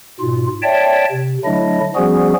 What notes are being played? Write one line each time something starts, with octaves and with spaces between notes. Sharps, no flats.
G#2 B2 F4
C#5 D5 E5 G5 A5
C3
D3 F#3 A3 D4 E4 D#5
F3 G3 B3 C#4 F#4 G#4